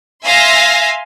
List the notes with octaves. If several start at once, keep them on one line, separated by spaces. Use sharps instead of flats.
E5 F5 G#5 C6 A#6